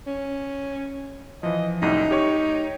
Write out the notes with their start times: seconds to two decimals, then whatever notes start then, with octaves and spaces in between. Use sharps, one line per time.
0.07 C#4
1.43 E3 F3 D#5
1.82 C2 F#2 A2 D#4
2.11 G4 C#5 C#6